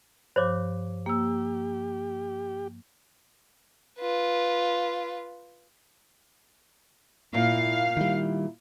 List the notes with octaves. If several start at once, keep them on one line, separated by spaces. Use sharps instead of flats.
G2 F3 C5 C#5 D6
A#3 G4 E6
F4 B4
A#2 E4 F5
D#3 G3 E4